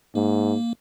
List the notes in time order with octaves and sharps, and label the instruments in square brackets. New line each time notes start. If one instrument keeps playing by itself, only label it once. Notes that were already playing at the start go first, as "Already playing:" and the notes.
[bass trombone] G#2 [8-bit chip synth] A#3